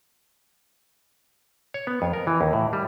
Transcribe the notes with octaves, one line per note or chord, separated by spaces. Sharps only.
C#5
B3
F2
A#4
E3
D#2
A2
G3